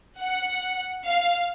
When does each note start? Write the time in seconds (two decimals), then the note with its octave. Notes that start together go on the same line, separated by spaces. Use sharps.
0.21 F#5
1.05 F5